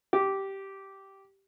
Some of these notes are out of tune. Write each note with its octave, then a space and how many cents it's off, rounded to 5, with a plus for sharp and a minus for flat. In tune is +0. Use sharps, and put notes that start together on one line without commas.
G4 -10